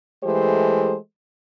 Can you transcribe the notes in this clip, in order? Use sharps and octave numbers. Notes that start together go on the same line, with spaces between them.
E3 G#3 A3 G4 A4 C5